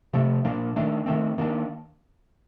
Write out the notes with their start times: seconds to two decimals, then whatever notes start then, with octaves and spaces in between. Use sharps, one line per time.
0.13 C3 F3 A3
0.45 A#2 F3 A#3 D4
0.76 D#3 A3 D4
1.06 D#3 A3 C4
1.38 D#3 A#3 D4